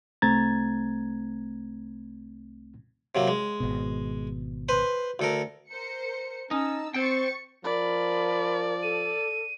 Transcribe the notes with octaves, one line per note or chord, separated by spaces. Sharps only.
C2 A3 C4 A#5 G#6 A6
C3 F#3 A#3
G#3
G#1 B2
B4 C5 C6
D2 A4 A#4
A#4 C5 C#7
C#4 D#4 A5 E6
C4 C5 G5 C#6 A6 C#7
F3 A#4 D5 B5
A4 D#7